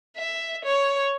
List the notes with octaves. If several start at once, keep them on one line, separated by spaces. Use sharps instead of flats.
E5
C#5